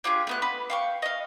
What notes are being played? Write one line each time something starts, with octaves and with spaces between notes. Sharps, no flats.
D4 F4 G4 G#4
A3 B3 F#6
B4
F5 G5 C#6
D#5 F5